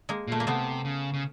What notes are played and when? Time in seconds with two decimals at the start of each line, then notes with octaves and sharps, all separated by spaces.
0.09 G#3 A#3
0.27 A#2 A3
0.40 A#3
0.47 C3 A3 B3
0.85 C#3
1.14 C#3